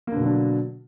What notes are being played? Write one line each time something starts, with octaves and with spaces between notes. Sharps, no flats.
B2 D3 F#3 A#3 D4